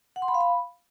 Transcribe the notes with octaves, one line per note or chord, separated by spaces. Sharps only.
F#5
C6
B5
F5
B5